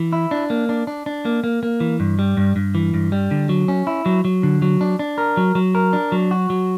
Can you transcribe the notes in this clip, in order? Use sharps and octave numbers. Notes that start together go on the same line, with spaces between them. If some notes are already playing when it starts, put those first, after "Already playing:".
Already playing: E3
E4
D4
A#3
D4
D4
D4
A#3
A#3
A#3
E3
G2
G3
G2
G2
E3
G2
G3
D3
F#3
C#4
E4
F#3
F#3
D3
F#3
D4
D4
A#4
F#3
F#3
A#4
D4
F#3
F#4
F#3